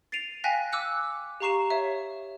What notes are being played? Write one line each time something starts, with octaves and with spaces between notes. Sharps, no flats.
A6 C7 D7 D#7 F7
F5 G5 G#5 F#6 A#6 B6
D6 E6 F#6 C#7
G4 F5 A#5 C#6 C7 E7
C#5 E5